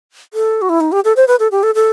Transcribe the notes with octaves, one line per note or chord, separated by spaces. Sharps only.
A4
F#4
E4
D#4
G4
A4
C5
B4
A4
G4
A4
A4